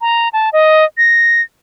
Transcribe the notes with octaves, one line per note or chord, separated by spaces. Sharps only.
A#5
A5
D#5
A#6